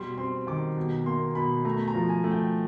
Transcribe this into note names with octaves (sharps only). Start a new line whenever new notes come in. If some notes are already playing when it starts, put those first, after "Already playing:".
Already playing: B2 G3 C6
C4 C6
D#3 D6
B2
A#3 C6
B2 B5
A3 A#5
A#5
F3
G#5
A3
G5